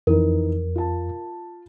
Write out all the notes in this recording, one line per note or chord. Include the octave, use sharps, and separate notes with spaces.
F2 E3 D#4 A#4
F4 A5